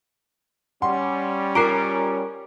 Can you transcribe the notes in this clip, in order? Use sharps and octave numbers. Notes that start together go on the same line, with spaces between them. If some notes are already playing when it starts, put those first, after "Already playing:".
G3 C#4 F#5 C6
F4 A#4 A#5 D6 F#6 C7 D7